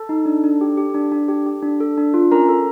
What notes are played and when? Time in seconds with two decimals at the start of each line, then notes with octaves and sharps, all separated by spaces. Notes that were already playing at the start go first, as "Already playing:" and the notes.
Already playing: A4 A5
0.09 D#4
0.26 D4
0.44 D4
0.61 G4
0.77 G4
0.94 D4
1.12 D4
1.28 G4
1.46 G4
1.63 D4
1.80 A4
1.97 D4
2.14 F4
2.32 C#4 A#4 A#5
2.49 A4